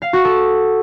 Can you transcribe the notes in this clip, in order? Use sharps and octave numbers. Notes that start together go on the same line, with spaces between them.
F5
F#4
A4